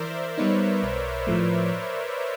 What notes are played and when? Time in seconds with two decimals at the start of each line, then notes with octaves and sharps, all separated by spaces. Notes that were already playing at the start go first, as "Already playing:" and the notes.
Already playing: E3 A#4 C5 D5 E5
0.38 G3 B3 D#4 B4 C#5
0.83 B1
1.27 A2 F3 A3